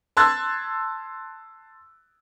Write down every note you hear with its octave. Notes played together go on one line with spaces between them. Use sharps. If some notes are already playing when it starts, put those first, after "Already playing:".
A5 C6 E6 F#6 G#6 A6